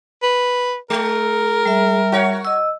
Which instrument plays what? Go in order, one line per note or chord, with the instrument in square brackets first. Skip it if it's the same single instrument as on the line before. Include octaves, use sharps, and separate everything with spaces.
[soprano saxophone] B4
[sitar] G#3 [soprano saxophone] A#4
[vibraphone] G3 E5
[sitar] F#4 C#5
[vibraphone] D#5 E6